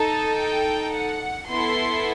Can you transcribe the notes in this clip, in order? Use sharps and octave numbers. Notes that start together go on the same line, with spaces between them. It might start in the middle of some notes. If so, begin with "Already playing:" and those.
Already playing: D#4 A4 A5
G5
F#5
B3 E4 A4 C6